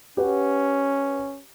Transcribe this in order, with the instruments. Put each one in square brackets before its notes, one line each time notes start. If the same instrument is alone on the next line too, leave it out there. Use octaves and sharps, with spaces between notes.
[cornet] C#4 [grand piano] G4 B4 F#5